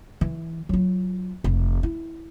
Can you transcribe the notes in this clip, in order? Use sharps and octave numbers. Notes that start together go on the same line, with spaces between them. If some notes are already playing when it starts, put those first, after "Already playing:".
E3
F#3 F4
F1
E4